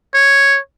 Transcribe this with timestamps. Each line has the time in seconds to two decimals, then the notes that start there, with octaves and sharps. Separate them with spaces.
0.14 C#5